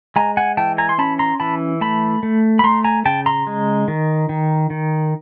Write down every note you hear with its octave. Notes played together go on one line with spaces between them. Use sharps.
G#3 G#5 A#5
F#5 G#5
E3 G5 A5
G#5 A#5
C6
C#4 A5 B5
A#5 C6
E3 A5 B5
A3 A5 B5
A3
B5
A3 A#5 C6
G#5 A#5
C#3 G5 A5
A#5 C6
G#3
D#3
D#3
D#3